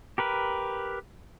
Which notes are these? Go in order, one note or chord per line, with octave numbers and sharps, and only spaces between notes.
G4 A#4 B4